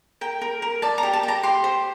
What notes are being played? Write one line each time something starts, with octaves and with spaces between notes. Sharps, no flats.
A#4 G5
A#4
A#4
D5 A5
A#5
G4
A5
G4 A#5
G4 C6
C5